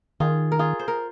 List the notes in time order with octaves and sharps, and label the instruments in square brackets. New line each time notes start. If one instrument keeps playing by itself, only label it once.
[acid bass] D#3 [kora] F4 G#4
[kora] A#4
F4 G#4
C5
A#4